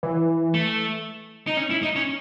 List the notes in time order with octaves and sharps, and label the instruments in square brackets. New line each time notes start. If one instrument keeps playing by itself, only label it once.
[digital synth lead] E3
[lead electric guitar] A3
D#4
C#4
E4
D#4
C#4